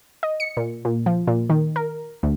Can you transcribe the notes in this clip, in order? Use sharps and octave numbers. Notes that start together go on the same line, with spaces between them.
D#5
C#7
A#2
A#2
F3
A#2
D#3
A#4
D2